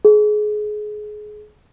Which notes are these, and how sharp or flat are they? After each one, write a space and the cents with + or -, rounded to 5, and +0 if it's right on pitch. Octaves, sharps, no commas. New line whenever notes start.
G#4 +25